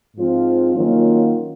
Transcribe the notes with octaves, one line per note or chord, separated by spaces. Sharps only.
G#2 F3 C4 F4 C5
D#3 F#3 A#3 C#4 F4